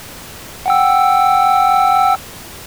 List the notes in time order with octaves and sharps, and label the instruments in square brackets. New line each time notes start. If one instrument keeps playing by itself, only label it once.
[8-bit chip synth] F#5 G5 E6